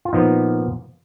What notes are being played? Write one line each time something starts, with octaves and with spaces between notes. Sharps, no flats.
F4
A#2 F3 B3 D#4